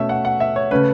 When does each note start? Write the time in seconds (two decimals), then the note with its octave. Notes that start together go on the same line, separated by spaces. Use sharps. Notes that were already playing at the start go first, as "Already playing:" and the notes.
Already playing: B2 A3 C#4 E5
0.09 F#5
0.25 F#5
0.40 E5
0.56 C#5
0.71 C#3 A3 C#4 B4